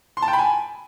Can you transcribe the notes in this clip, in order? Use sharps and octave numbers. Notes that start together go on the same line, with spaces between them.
C6
A5
G5
B5
G#5